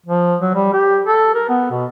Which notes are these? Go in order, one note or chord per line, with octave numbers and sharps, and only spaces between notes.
F3
F#3
G3
G4
A4
A#4
B3
B2